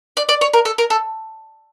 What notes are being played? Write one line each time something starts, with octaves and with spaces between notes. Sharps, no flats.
D5
D5
C#5
A#4
A4
A#4
A4